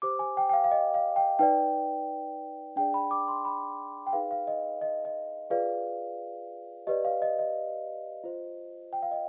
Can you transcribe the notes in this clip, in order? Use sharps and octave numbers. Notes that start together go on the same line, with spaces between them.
G4 C5 D6
G#5
G5
G5
F5
F5
D#5
F5
G5
D#4 B4 D5 G5
D4 G#4 D5 G5
B5
D6
C6
B5
G5
D#4 G#4 B4 F5
F5
D#5
D#5
D#5
F4 G#4 B4 D5 F5
G4 B4 D5 D#5
F5
D#5
D#5
F4 C5
G5
F5
D#5